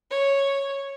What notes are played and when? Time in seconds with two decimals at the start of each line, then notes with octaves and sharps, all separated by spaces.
0.11 C#5